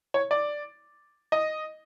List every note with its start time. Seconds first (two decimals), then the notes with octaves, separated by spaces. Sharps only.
0.14 C#5
0.31 D5
1.32 D#5